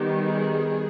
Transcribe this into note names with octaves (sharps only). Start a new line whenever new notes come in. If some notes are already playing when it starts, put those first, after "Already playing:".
Already playing: D#3 G3 B3 G4
G#4